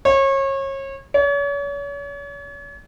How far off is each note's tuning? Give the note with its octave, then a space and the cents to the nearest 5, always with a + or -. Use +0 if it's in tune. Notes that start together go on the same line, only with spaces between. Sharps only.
C#5 -30
C#5 +40